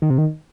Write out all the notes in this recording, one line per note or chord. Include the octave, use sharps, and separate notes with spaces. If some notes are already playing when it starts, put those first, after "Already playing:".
D#3
C3
D#3